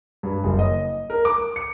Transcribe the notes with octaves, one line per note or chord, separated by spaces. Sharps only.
G2
F#1
D#5
A#4
D6
C#7